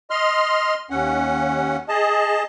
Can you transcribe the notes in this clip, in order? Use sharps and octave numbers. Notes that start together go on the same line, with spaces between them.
D#5 C6 F6
D#2 C#4 F#5
G#4 D#5 A5